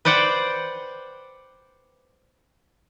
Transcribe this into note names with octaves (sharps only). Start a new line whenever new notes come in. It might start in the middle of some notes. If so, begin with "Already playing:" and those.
B4 C5 D5 F#5 G5